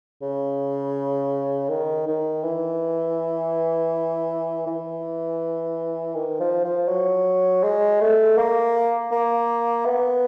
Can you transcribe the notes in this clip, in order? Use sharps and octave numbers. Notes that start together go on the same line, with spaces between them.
C#3
D#3
D#3
E3
E3
D#3
F3
F3
F#3
G#3
A3
A#3
A#3
B3